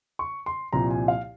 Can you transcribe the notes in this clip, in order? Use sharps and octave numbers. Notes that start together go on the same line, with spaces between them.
C#6
C6
C2 A#2 F3 A#5
G#5
F5